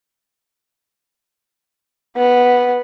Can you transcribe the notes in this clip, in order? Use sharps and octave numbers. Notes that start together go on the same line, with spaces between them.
B3